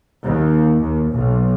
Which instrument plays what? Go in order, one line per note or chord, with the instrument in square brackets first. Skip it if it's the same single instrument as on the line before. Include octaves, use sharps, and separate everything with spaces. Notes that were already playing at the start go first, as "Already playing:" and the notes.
[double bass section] D#2
D#2
B1